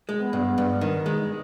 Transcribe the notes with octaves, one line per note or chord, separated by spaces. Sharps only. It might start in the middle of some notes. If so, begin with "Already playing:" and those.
G#3
B3
G2
G2
D#3
G#3